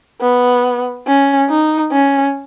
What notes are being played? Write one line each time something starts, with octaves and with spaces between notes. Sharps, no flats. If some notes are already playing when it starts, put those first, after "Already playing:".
B3
C#4
D#4
C#4